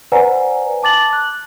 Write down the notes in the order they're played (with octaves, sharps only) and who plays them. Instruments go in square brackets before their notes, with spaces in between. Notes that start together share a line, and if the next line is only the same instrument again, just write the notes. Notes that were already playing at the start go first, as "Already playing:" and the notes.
[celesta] B4 C5 D5 F#5 G#5 A#5
A5 D6 A6 F#7
F#6